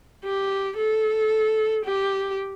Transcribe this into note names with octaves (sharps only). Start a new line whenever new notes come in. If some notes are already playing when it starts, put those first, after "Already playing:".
G4
A4
G4